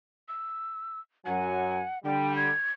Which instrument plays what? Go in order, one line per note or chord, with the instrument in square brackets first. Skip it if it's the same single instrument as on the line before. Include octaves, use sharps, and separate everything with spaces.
[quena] E6
[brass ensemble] F#2 F#3 G#5 [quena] F#5
[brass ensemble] D3 G3 [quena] G5
[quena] G#6